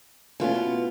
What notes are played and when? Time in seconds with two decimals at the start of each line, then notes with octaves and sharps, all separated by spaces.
0.40 B2 E3 A3 C#4 F4
0.55 B3